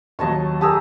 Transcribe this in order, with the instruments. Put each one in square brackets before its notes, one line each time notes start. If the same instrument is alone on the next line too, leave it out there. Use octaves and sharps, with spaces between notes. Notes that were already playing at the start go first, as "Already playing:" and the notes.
[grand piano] D#2 F#3 [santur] D#5 A5 C#6
[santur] G4 G#4 A#4 [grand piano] A5 D#6 E6